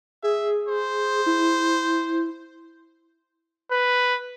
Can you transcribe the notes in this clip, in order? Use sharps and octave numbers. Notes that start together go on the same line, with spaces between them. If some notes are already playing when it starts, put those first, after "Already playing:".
G#4 E5
C5
E4
B4